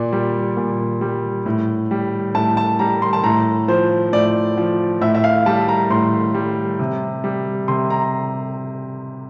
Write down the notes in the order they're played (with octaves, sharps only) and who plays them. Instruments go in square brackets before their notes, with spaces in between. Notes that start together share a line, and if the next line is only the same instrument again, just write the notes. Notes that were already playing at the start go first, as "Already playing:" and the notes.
Already playing: [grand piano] A#2 D5
G3
A#2
G3
A2
G3
A2 A5
A5
G3 A#5
C6
A5
A2 A#5
F3 C5
A2 D5
F3
A2 E5
E5
F5
G3 A5
A#5
A2 C6
G3
C3
G3
C3 C6
A#5